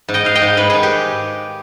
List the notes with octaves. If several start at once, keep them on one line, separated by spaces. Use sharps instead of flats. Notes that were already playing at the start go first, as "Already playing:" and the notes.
G#2
D#5 G5
G#2 F5
D#5 G5
G#2
G#2 B4
D#3 G#4
G4